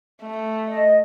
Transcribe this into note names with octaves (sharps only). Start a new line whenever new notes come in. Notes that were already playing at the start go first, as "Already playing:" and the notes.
A3
D#5